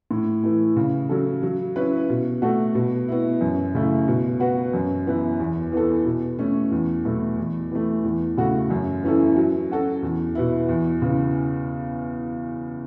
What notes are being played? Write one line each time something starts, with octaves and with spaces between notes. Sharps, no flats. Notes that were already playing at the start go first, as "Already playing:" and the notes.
A2
E3 A3
C#3
F#3 C#4 A4
F#3
C#4 E4 B4
B2
A3 F#4 A4
B2
B3 E4
F#2
C#3 A3 E4
B2
B3 F#4 B4
F#2
E3 B3 E4 B4
E2
E3 B3 A4
B2
A3 C#4
E2
B2 F#3 A3 E4
E2
E3 A3
E2
C#3 A3 F#4 A4
F#2
E3 C#4 E4 A4
F#3
C#4 F#4 A4
E2
B2 B3 E4
E2
C#3 E3